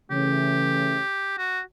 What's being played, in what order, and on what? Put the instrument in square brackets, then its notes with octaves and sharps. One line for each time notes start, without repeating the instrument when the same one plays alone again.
[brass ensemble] C#3 E3 A3 C#4 [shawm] G4
[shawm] F#4